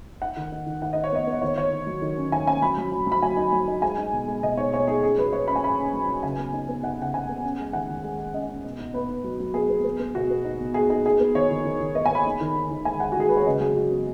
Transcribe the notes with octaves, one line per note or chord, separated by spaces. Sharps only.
D#4 F#5
D#3
D#4
D#3
D#3 F#5
D#4 D#5
C#5
B3 D#5
B3 D#5
D#3 C#5
D#3 C#5
D#3
F#3
D#3
C#4
D#3 G#5
C#4 G#5
F#3 B5
F#3
F#3
F#3 B5
F#3 G#5
D#4
F#3
D#4
G#3 G#5
D#4
B2
G#3
B2 D#5
D#4 C#5
B2 C#5
D#4 G#4
C#4 G#4
F#3 B4
F#3 C#5
C#4 B5
G#5
C#4 B5
C#4
F#3
F#3
C#3 G#5
B3
D#4
B3
D#4 F#5
C#3 F#5
C#3 G#5
B3
C#4
G#3
D#3 F#5
D#3
G#3
G#3
C#4 D#5
C#4
B2
D#4
B3 B4
D#4
F#3
F#3
B3 G#4
B3
B3
B3
B2 F#4
B3
D#4
B2
B2 G#4
D#4 G#4
D#4 G#4
B3
D#3 C#5
D#3
D#3
D#3
B3 D#5
G#5
B3 B5
D#4
D#3
D#4
D#3
G#3 G#5
G#3 F#5
F#4
D#3 G#4
G#3 B4
C#5
C#3 D#5
F#3 G#4
F#3 F#4
B3